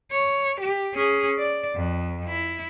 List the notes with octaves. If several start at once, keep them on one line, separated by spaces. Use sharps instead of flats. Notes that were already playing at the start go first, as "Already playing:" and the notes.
C#5
G4
C#4 G#4
D5
F2
E4